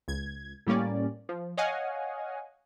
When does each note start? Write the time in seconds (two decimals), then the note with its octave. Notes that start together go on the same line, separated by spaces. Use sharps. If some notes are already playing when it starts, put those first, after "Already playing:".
0.08 C#2 G#6
0.67 A2 G3 A#3 C#4 D5
1.29 F3
1.57 C#5 D#5 F5 F#5 G#5